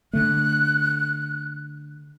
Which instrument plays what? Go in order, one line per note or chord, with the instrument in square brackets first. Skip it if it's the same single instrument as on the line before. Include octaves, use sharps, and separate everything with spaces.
[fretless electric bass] D3 A3 [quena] F#6